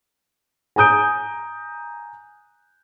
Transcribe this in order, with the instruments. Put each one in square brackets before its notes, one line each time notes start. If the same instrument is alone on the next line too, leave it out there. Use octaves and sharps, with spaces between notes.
[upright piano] G#5 A#5 D#6 G6 D7